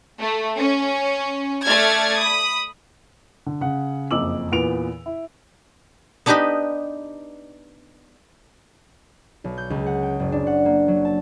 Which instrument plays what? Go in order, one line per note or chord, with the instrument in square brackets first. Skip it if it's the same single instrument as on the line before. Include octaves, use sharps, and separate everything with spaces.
[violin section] A3
C#4
A3 D5 A5 F6 G#6 A6
B5 D#6
[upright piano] D3
C#3 F#5
F#1 F2 D#5 D6 E6 F#7
E2 A#2 B3 D7 F7
E4
[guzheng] B3 D4 D#4 G4 B4 D#5
[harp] B1
G6
C#2
F#5
G5
F#1
D4
F#5
A#3
F#3
A5